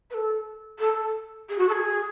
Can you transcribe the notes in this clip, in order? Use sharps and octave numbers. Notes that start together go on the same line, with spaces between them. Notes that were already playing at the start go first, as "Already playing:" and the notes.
B4
A4
A4
G#4
F#4
A4
G#4